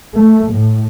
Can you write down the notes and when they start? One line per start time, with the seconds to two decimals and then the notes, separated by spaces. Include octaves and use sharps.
0.15 A3
0.51 A2